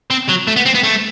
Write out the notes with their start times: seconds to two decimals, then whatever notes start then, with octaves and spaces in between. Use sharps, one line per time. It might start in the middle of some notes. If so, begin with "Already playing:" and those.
0.11 C4
0.29 F#3
0.48 A3
0.56 B3
0.66 C4
0.75 B3
0.84 A3